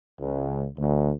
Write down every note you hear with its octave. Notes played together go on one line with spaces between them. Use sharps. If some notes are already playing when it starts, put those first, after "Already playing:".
C#2
D2